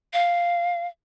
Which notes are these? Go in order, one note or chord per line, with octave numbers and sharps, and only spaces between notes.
F5